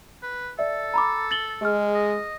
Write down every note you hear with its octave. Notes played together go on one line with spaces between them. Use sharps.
B4
A4 D5 E5
A#5 B5 D6
A6 F#7 G7
G#3 G#4 F6
D#5